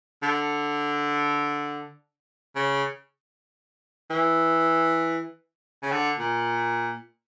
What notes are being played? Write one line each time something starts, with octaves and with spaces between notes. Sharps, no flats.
D3
C#3
E3
C#3
D3
A#2